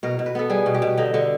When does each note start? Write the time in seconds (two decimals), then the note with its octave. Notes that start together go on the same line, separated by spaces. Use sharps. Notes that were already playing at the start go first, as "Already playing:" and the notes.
0.03 B2 A#4
0.19 B2
0.26 B4
0.35 B3 A4
0.50 G3 G#4
0.66 B2
0.74 G4
0.82 B2
0.97 D3 D#4
1.14 D3